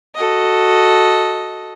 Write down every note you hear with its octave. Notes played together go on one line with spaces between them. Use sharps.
F#4 A4 D#5